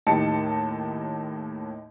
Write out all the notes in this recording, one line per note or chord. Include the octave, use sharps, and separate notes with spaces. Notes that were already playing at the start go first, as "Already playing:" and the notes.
D#2 A2 D#4 G4 A5 C#7